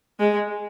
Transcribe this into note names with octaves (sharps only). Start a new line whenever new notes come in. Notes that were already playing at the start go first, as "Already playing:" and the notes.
G#3